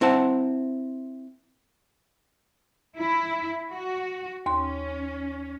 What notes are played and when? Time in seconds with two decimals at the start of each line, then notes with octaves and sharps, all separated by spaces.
0.01 C4 E4 F#5 A5
2.97 E4
3.70 F#4
4.46 D#2 C#4 C6